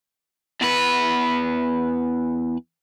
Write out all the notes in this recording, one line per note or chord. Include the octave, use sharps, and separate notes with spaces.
E2 B4